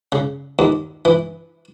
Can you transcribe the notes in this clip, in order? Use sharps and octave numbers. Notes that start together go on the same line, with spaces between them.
C#3
D#2
E3